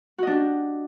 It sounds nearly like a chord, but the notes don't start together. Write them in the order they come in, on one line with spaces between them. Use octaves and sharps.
F#4 D#5 D4 G4